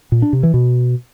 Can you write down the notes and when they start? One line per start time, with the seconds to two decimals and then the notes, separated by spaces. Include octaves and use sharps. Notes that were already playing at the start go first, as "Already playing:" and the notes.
0.12 A#2
0.22 D4
0.33 C3
0.43 E3
0.54 B2